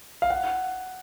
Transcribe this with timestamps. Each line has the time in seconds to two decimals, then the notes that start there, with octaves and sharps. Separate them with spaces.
0.22 F5
0.30 F#5